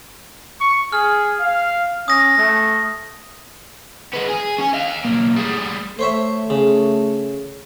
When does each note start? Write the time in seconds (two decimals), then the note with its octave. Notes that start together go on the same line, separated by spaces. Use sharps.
0.60 C#6
0.92 G#4 F6
1.39 F5
2.08 C#4 D#6 A#6
2.37 A3
4.14 G#3 B3
4.30 G#4
4.59 C#4 G#5
4.74 D#5 F5
5.05 B1 A#3
5.36 G3 G#4
5.99 A3 C5 C#5 E5
6.50 C#3